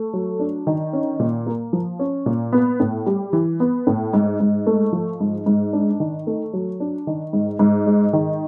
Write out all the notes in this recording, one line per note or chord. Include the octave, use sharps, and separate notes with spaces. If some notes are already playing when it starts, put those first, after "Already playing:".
Already playing: A3
F#3
D4
D#3
C#4
A#2
A#3
F3
C#4
A#2
B3
A2
G3
E3
B3
A2
G#2
G#2
A3
F3
G#2
G#2
D4
D#3
A3
F#3
D4
D#3
G#2
G#2
G#3
D#3